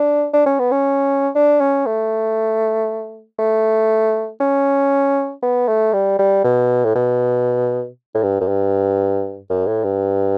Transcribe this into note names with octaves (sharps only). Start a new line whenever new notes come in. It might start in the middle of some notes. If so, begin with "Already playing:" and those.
Already playing: D4
D4
C#4
B3
C#4
D4
C#4
A3
A3
C#4
B3
A3
G3
G3
B2
A2
B2
A2
G2
F#2
G2
F#2
A2
G2